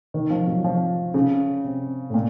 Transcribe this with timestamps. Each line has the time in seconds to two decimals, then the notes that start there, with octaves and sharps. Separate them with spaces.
0.14 D#3
0.30 F3
0.47 F#3
0.64 F3
1.14 C#3
1.64 C3
2.10 A2
2.14 A#2